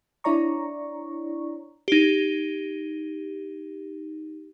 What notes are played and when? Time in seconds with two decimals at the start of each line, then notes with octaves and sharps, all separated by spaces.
0.24 D4 E4 C#5 D5 A#5 C#6
1.88 D#4 G4